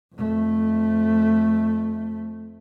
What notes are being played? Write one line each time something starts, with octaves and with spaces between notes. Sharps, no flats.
F2 A3